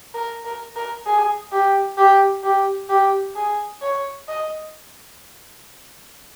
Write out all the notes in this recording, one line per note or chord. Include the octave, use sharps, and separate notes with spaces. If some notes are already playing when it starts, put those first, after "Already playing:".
A#4
A#4
A#4
G#4
G4
G4
G4
G4
G#4
C#5
D#5